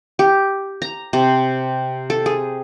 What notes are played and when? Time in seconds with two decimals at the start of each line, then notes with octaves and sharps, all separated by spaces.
0.19 G4
0.82 A#5
1.13 C3
2.10 A4
2.26 G#4